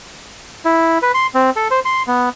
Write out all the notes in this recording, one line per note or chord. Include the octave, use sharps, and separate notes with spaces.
E4
B4
C6
C4
A4
C5
C6
B3